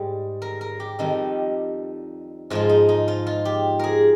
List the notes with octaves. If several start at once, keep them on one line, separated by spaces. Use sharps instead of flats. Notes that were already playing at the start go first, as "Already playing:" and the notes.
Already playing: G#2 G3
A#4
A#4
G4
F2 D#3 G3 D#4
G#2 F3 G#3 F4
D#4
D#4
F4
F4
G4
G#4 A#4